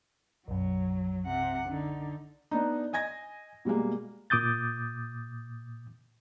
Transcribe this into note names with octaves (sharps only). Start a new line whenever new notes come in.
B1 F#2 F#3
C3 F#5
D3 D#4
B3 D4 D#4
D#5 G#5 G#6 A#6
B2 G3 G#3 A#3
A#2 D6 D#6 G6 A6